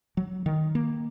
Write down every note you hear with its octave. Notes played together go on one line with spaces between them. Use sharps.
F#3
D#3
A#3